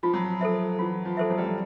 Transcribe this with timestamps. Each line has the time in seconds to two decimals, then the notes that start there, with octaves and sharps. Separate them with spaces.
0.03 F3 F4
0.14 F#3
0.24 F3
0.41 A4 C5 E5
0.79 E3 F4
1.05 F3
1.17 A4 C5 E5
1.30 F#3
1.38 G3
1.44 F#3